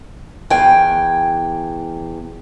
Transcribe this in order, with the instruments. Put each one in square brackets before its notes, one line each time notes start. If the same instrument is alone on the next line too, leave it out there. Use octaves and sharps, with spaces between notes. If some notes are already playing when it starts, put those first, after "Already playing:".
[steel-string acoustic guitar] E2 G5 G#5